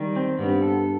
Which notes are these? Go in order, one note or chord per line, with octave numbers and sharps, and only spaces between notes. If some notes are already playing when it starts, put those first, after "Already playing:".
Already playing: D#3 G3
C4
G2 B3
A4